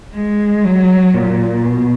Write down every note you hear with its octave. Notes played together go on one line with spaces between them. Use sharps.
G#3
F#3
A#2
B2